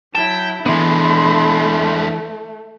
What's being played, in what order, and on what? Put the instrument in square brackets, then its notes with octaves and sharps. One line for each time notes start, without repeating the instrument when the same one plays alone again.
[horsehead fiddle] F#3 E4 [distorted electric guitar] G5 [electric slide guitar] A5
[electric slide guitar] E3 B3 [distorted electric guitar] G#3 D4 [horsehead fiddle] A3 [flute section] B5 C6